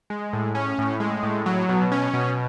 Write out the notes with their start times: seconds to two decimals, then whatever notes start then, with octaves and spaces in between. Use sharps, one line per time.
0.10 G#3
0.33 A2
0.55 C#4
0.78 A2
1.00 G#3
1.23 A2
1.46 F#3
1.69 B2
1.92 C#4
2.14 B2